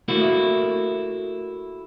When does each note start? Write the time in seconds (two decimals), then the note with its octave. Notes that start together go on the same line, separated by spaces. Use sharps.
0.08 A3 A#3 E4 F#4